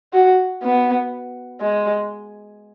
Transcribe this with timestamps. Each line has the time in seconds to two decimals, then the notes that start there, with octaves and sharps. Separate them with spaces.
0.13 F#4
0.63 B3
1.61 G#3